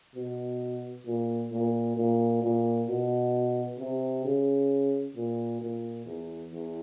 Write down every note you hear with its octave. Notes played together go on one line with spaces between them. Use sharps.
B2
A#2
A#2
A#2
A#2
B2
C3
C#3
A#2
A#2
E2
E2